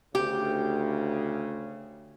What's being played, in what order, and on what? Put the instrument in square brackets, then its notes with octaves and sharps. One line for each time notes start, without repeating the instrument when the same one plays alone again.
[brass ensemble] D2 C#3 [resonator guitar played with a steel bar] G4